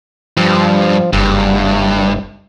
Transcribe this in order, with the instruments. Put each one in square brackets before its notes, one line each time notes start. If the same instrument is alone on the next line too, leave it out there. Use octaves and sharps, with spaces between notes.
[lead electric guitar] G2 [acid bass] F3
[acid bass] F#1 [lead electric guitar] G2